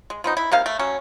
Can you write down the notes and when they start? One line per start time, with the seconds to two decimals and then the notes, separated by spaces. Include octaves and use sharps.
0.10 G#3
0.24 F3 B3 D#4
0.37 E4
0.52 C3 A#3 D#4 F5
0.66 A3
0.79 F#3 C#4